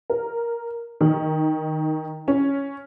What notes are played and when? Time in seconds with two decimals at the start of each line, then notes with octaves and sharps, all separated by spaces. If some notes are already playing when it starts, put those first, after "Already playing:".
0.10 A#4
1.01 D#3
2.28 C#4